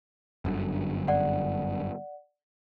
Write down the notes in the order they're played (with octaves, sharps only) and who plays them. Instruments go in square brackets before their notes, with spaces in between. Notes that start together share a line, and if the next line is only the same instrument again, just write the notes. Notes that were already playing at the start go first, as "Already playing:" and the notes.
[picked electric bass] G1 F#2 D3
[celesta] D5 F#5